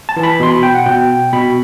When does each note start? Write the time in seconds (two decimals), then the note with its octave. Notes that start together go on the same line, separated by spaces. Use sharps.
0.09 A5
0.16 E3
0.23 B5
0.40 B2 C6
0.51 B5
0.63 G5
0.75 F#5
0.86 B2 G5
1.33 B2 B5